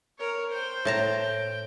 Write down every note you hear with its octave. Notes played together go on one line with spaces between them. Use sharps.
A#4 C#5
C5 G5
A2 A5 A#5
G5